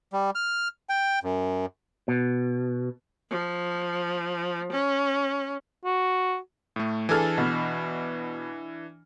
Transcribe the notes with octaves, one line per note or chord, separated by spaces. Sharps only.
G3
F6
G5
F#2
B2
F3
C#4
F#4
A2 A3
E3 D4 G#4 A4 G#5 F6
B2